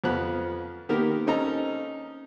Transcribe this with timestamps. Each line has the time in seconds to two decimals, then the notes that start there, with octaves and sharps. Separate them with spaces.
0.04 F2 F3 B3 F#6
0.89 D#3 A#3 B3 G4 A#4
1.27 C4 C#4 D#4 A4 A#5